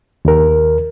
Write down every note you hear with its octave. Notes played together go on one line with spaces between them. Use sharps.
D#2 A#4